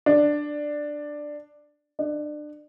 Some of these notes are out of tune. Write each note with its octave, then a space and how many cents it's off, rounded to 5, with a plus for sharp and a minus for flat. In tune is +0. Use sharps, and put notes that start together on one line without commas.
D4 +10
D4 +30